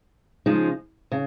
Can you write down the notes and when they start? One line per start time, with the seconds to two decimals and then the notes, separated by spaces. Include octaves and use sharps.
0.46 C#3 F3 G#3 D#4
1.12 C#3